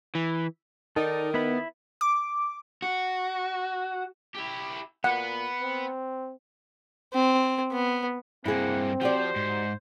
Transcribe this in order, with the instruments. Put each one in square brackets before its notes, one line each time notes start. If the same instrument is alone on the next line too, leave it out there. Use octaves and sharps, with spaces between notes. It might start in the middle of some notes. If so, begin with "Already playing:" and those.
[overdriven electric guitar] E3
[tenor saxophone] D#3 [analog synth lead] D#4 [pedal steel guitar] A4 D5
[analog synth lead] B3 [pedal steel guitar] E4 B5
[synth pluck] D6
[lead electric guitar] F#4
[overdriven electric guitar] E4 G4
[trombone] A#2 [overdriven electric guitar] B3 B4 [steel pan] F#5
[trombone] C4
[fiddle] C4
B3
[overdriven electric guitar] G2 A#3 [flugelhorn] C4 [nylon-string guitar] E4 G#4 [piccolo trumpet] F#5
[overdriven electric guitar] F3 [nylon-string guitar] F#4 G4 D5 [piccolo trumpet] C5
[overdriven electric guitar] G#2